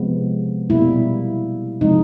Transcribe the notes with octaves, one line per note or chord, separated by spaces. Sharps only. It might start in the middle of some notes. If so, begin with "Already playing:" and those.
Already playing: C3 F3 G#3 B3
B2 G3 A#3 E4
C3 F3 G#3 D#4